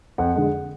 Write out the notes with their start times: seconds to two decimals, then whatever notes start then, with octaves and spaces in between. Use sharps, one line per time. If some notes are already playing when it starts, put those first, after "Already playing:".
0.18 F2 F#5
0.35 D3 G#3